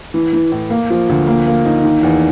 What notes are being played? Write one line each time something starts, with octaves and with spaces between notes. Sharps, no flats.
E3
E3
A2
A#3
F3
D2
A#3
A#3
D#4
D#3
E2